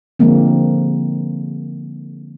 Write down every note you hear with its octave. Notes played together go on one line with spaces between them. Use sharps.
D3 F3 G#3 A#3 C4